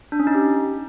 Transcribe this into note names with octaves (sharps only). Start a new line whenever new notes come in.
D4
C#4
D#4
G4